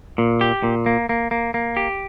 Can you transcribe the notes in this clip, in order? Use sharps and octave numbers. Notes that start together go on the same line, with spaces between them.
A#2
G4
A#2
A#3
A#3
A#3
A#3
G4